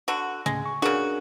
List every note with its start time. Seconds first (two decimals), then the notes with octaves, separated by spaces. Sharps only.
0.08 D3 F#4
0.46 D2 A2 C#3 G#3
0.66 C#6
0.82 C#3 D4 F#4 G#4 A#4